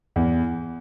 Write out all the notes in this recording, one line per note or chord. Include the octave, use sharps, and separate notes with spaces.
E2